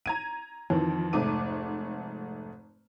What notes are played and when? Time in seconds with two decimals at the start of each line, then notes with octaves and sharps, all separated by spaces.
0.06 A#5 G#6 D#7
0.70 F2 D#3 E3
1.13 F1 G#2 A3 D6 D#7